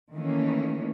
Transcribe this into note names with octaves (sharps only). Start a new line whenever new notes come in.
D#3 E3 A3 A#3 C#4